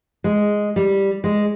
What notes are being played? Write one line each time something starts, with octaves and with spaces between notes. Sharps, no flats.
G#3
G3
G#3